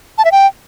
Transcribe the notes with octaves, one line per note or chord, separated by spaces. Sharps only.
A5
E5
G5